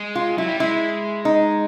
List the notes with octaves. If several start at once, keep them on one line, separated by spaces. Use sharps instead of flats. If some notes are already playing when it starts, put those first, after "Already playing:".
Already playing: G#3
F4
F#3 E4
G3
G#3 E4
D#4